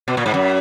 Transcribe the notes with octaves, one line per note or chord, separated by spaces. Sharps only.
B2
A#2
G#2
F#2